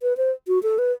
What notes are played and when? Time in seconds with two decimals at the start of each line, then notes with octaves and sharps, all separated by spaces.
0.02 B4
0.17 C5
0.48 F#4
0.63 A4
0.78 B4